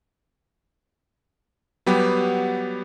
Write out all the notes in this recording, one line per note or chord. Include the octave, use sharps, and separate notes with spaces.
F#3 G3 B3 G4